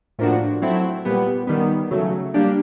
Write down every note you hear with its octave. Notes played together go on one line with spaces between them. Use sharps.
A2 F3 A#3 D4 F#4
F#3 A3 C4 E4
A#2 G3 B3
D#3 G3 B3
C#3 F#3 A3
G3 A#3 D4 G4